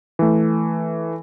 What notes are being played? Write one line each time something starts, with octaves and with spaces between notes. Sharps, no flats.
E3 A3